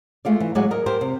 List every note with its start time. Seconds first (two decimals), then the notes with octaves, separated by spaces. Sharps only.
0.25 G#3 A3 F4 D5
0.40 E3
0.55 A2 F#3 G#3 D5 F#5 G#5
0.71 A#4 D#5
0.86 G4 A#4 C5
1.01 C3